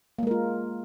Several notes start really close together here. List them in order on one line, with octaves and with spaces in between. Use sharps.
A#3 G#3 A#4 F4